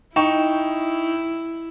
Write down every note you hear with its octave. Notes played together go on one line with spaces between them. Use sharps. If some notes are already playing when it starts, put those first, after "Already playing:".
D#4 E4 G5 C#6 E7